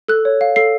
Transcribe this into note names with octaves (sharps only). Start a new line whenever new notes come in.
A4 F#6
C#5
F5
A4 C7